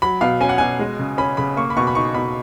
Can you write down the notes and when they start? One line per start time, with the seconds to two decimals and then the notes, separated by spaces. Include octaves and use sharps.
0.02 F#3 B5
0.21 B2 F5
0.41 C#4 G#5
0.49 F#5
0.58 B2 G#5
0.79 G#3
0.99 C#3
1.18 C#4 B5
1.37 C#3 B5
1.57 A#3 C#6
1.70 B5
1.77 B2 C#6
1.87 B5
1.95 D#4 C#6
2.14 B2 B5